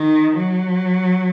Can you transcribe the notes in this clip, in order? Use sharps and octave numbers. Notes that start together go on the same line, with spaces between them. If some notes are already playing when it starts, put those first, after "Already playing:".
Already playing: D#3
F#3